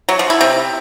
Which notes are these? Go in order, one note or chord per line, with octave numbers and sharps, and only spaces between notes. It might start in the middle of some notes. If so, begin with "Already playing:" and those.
F#3
F3
E4
C3